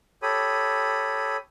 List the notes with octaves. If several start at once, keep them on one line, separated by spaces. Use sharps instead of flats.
G4 A4 C#5 B5 D#6